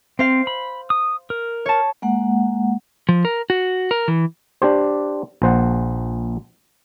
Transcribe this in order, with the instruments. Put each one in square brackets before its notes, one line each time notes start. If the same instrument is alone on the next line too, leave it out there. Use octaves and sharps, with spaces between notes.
[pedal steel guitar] C4 [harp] C5 F5 C7
[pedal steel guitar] B5
D#6
A#4
[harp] C#5 A5
[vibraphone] G#3 A#3 F#5
[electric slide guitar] F3
A#4
F#4
A#4
E3
[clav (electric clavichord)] D4 G4 C5
A#1 C5 F#5